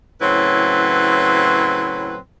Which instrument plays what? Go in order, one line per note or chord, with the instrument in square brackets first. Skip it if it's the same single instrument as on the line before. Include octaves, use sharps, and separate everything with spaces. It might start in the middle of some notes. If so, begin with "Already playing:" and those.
[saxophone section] A2 C#3 F#3 C4 E4 B4